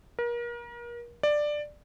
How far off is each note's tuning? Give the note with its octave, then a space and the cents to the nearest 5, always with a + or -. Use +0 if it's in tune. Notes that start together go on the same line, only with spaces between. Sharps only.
A#4 +35
D5 +10